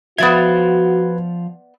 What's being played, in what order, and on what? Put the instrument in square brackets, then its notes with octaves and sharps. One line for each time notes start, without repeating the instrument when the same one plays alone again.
[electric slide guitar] F3 F4 [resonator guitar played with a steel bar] B3 D5 E5 [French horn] F#4 [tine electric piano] B4 G#6